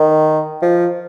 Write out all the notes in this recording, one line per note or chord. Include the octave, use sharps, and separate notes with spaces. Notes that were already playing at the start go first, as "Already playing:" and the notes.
Already playing: D#3
F3